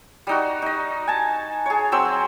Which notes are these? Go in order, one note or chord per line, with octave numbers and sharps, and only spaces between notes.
G3 D#4 F#4
D#4 D#5
G#5 A5
G#4 C#5
F#3 C4 E6